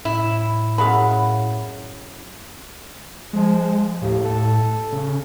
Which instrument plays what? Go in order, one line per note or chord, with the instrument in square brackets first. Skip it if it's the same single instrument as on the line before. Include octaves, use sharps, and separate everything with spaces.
[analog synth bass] A2 [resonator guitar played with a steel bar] E4
[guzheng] F#2 F#4 F5 [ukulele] G#4 E5 B5
[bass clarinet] F3 [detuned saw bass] G#3
[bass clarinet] D#2 [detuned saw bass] A2
[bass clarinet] A4
[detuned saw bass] C#3